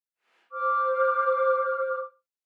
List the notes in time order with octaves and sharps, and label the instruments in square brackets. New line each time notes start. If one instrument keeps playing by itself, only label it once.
[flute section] C5 D6 F6